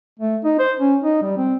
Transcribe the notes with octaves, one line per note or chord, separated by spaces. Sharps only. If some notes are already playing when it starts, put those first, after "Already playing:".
A3
D#4
C5
C#4
D#4
G3
C4